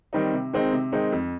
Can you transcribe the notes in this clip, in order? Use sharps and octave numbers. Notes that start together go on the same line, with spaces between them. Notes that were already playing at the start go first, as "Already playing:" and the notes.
D#3 G3 C4 D#4
C3
D#3 G#3 C4 D#4
C3
D#3 G#3 C4 D#4
F2